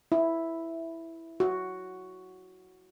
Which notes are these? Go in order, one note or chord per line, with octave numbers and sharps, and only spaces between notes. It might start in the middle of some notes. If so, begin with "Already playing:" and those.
E4
F#4